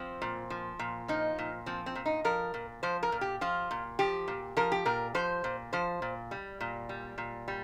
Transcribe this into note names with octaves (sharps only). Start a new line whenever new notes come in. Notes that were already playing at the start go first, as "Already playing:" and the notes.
Already playing: F3 C4
A#2
F3
A#2
F3 D#4
A#2
F3 C4
C4
A#2
D#4
F3 A#4
A#2
F3 C5
A#4
A#2
G4
F3 F4
A#2
F3 G4
A#2
F3 A#4
G4
A#2 A#4
F3 C5
A#2
F3 C5
A#2
G3
A#2
G3
A#2
G3